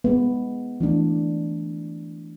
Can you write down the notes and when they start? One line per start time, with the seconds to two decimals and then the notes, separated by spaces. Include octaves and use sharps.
0.04 G#3 B3
0.81 E3 A3 D4